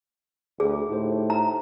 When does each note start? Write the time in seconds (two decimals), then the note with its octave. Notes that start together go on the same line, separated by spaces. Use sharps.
0.60 D2 G#4
0.89 A2 D#4 G4 C5
1.30 A#5